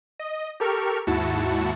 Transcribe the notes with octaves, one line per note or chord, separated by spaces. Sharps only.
D#5
G4 A4 A#4 C#6 F6
D#2 G#2 E4 F#4 A5 C#7